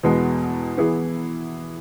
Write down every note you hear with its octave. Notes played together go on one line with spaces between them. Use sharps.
E2 B2 G#3 B3
E3 B3 E4 G#4